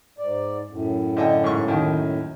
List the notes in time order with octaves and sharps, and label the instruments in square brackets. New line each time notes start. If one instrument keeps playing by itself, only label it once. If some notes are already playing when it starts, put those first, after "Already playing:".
[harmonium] G#2 D5
F#2 A2
[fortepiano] D3 D#5 G5
G#2 C#6
D#2 D#3